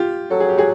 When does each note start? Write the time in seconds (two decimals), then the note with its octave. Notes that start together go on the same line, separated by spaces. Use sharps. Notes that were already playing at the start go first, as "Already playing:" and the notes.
Already playing: F4 G4
0.30 F#3 A4
0.40 G#4
0.49 G4
0.58 F#4 G#4